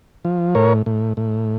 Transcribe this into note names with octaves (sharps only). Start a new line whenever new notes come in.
F3
A2 A#4 C#5
A2
A2